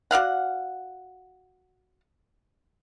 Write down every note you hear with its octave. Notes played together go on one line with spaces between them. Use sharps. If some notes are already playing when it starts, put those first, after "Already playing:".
F#4 D5 F5 F#5